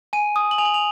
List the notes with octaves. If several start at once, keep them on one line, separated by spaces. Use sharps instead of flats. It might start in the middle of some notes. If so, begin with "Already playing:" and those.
G#5 D#7
D#6
F#7
G#5 F7
F#7
F7